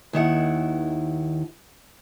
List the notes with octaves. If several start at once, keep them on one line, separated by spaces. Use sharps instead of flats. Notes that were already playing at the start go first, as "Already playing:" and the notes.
D#2 D#3 E4 F#5